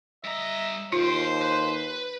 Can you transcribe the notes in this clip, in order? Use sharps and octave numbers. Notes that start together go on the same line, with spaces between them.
G2 D#5 E5 A#5
D#2 F4 C5 F5 G5
B4